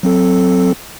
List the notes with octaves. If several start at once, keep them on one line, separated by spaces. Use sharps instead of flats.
F#3 C4 A4